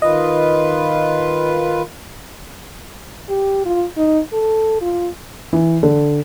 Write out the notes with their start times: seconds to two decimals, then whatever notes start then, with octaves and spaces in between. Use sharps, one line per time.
0.02 D#3 F4 B4 D#5
3.29 G4
3.66 F4
3.97 D#4
4.33 A4
4.82 F4
5.53 E3
5.83 D3